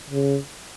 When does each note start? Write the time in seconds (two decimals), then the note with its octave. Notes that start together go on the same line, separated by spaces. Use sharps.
0.10 C#3